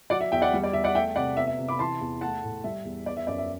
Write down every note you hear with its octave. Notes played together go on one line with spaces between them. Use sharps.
F#3 D5 F#5
E5
E2 E5 G5
D5 F#5
G3
D5
E2 E5
D5 F#5
A3 E5 G5
C3 D5 F#5
B3 E5
E5
C3
B5 D6
E3 A5 C6
E2
A3 F#5 A5
A2
G3 E5
E2
B3 D5
E5
F#2 D5
E5